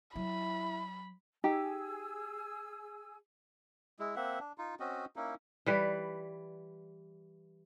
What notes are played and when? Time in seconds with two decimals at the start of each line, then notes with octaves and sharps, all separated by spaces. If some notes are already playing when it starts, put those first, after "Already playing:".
0.16 F#3 E4 B5
1.44 D#4 G4 G#4 G#5 E6
3.99 G#3 E4
4.16 A#3 C4 E5 F#5
4.40 D4
4.58 D#4 F4
4.80 C4 C#4 F#4 D#5
5.16 A#3 C#4 D#4 E4
5.66 E3 G3 B4